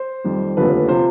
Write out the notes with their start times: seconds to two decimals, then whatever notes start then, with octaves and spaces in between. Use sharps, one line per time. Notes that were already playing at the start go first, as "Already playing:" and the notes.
Already playing: C5
0.24 F2 D#3 G3
0.57 F1 D#2 D3 F3 B4
0.88 C3 F3 C5